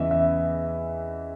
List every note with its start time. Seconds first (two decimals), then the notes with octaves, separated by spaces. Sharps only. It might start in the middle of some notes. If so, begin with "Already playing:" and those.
Already playing: E2 C#3 E3 D#5 E5
0.11 E5